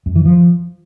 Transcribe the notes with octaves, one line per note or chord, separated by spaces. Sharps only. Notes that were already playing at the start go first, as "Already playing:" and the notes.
F#2
E3
F3